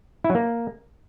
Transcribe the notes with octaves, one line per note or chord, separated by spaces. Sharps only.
E4
F#3
A#3